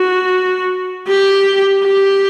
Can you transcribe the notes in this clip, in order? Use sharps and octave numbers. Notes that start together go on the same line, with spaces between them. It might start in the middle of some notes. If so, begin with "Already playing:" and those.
Already playing: F#4
G4
G4